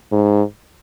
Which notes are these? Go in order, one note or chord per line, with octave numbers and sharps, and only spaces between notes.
G#2